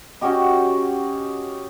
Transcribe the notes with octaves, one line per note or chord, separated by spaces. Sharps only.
C#4 F#4 G4 D#5